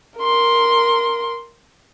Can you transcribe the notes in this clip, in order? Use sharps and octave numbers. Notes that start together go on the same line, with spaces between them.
A#4 C6